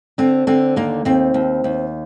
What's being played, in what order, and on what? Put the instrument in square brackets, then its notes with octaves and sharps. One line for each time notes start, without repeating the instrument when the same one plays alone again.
[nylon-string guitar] D3 C4
D3 C4
D#2 A#3
D#2 C4
D#2
D#2